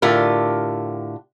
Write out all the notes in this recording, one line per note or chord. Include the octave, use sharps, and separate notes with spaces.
A2 D3 F4 G4 A#4